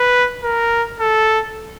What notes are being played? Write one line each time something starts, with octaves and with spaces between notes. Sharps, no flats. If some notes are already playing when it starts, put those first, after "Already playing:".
Already playing: B4
A#4
A4